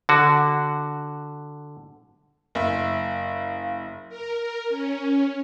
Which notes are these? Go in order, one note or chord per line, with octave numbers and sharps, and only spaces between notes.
D3 F#4
F#1 E5 F5
A#4
C#4